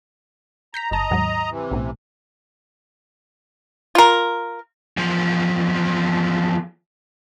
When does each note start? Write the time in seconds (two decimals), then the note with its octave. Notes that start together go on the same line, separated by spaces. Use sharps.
0.74 A#5 G6 A#6 B6
0.91 G1 D#5 A5 A#5
1.11 D#2 G#2 F#3
1.50 C3 E3
1.71 B1 A2
3.95 F4 A#4
4.97 E2 F3